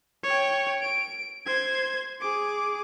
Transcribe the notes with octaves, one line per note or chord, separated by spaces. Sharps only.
C#5 G5
D7
C5 G#6
G#4 D6